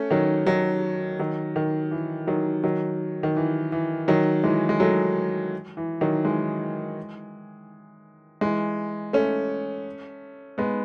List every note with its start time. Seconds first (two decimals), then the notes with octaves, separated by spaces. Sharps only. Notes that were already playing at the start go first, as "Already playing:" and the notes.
Already playing: A3 C#4
0.11 D#3 F#3
0.47 D#3 F#3
1.19 D#3 F#3
1.56 D#3
1.91 E3
2.27 D#3 F#3
2.64 D#3 F#3
3.23 D#3
3.37 E3
3.72 E3
4.08 D#3 F#3
4.44 E3 G#3
4.69 G#3
4.80 F#3 A3
5.77 E3
6.01 D#3 F#3
6.25 E3 G#3
8.41 E3 G#3
9.13 A3 C#4
10.58 G#3 B3